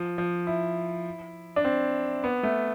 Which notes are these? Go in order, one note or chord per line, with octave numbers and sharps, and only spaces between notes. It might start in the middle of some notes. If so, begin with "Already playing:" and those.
Already playing: F3
F3
E4
D4
C4
B3
A3